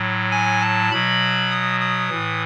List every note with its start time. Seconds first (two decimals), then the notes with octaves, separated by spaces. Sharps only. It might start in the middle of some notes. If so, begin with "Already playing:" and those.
Already playing: A2 F#3
0.31 G#5
0.61 A5
0.91 B2 F#3 B5
1.50 D#6
1.80 D#6
2.10 A2 E3